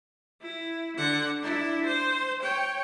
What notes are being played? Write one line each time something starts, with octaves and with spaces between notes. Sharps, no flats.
E4
D3 F#5
D4 E4
C5
C#5 G5